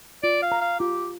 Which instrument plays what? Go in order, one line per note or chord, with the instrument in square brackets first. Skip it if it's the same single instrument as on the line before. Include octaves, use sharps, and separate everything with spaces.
[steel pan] F4 [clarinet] D5
[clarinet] F5
[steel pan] A#5
[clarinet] F5
[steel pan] F4 [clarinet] G4